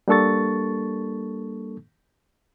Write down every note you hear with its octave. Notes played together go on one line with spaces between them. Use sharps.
G3 A#3 D4 A4 C#6 A6